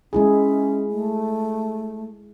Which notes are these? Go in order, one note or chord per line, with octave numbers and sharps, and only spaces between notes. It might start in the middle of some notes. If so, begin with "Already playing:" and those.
G#3 C#4 E4 G#4
A3